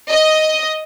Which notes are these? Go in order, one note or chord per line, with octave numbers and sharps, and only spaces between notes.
D#5